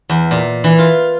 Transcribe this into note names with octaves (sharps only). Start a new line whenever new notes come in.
E2
A#2
E3
F4